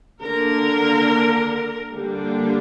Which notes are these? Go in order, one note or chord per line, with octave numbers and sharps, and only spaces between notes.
D3 A#3 D4 A#4
D3 G3 A#3 D4